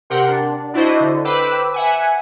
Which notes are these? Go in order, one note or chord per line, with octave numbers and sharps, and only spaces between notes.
C3 G4 A#4 F#5 G5 C6
D4
D4 E4 F#4 C5 D#5
D3
B4 C5 G5 B5 D6 E6
E5 F#5 G#5